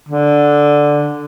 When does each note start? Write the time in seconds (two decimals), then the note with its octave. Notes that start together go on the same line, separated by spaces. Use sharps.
0.09 D3